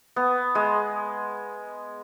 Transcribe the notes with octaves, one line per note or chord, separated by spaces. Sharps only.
B3
G#3